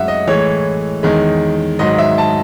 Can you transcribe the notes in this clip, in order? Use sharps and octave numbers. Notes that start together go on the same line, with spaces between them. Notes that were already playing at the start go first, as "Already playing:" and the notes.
Already playing: F#2 C#3 G#3 E5 F#5
D#5
A2 E3 G#3 C#5
E2 D#3 G#3
G#2 D#3 F#3 D#5
E5
A5